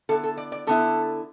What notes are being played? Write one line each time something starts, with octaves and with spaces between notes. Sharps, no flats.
D3 B3 E4 A4
A4
D5
D5
D3 B3 E4 A4